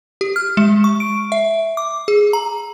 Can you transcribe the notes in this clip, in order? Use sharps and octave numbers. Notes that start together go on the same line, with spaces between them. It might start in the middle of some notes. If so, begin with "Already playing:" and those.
G4
F6
G#3
C#6
D7
E5
D6
G#4
A#5